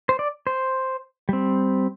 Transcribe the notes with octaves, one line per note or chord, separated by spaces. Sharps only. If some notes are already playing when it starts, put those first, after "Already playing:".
C5
D5
C5
G3 C4